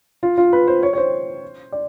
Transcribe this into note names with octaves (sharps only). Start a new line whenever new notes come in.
F4
F4
B4
C5
C#5
C#5
C5
D5